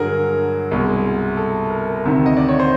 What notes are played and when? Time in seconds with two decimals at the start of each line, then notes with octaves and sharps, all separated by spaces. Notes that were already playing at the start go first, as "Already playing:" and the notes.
Already playing: G2 D3 F#3 G#4 A#4
0.71 C2 B2 G#3
1.37 A4
1.70 A#4
2.04 D2 C3 D#3
2.26 D#5
2.37 D5
2.49 C#5
2.60 C5